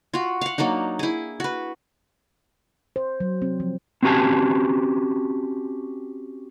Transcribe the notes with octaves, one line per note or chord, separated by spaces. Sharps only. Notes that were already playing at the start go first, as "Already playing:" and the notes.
F4 F#4
F5 F#5
F#3 A#3 D4 D#4
E4 G#4
F#4 B4
C5
F#3
C4
F3
C4 C#4 F#4 G4 G#5 A5